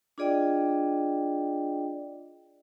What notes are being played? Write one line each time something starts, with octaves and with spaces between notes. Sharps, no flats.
D4 F4 G#4 D5 D#5 G5